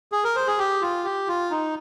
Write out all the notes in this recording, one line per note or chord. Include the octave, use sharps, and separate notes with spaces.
G#4
A#4
C5
G#4
G4
F4
G4
F4
D#4